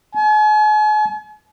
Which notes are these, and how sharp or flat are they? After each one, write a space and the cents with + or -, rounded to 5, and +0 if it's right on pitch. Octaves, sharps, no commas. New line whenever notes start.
G#5 +45